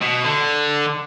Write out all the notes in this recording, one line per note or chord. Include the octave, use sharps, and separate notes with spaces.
B2
D3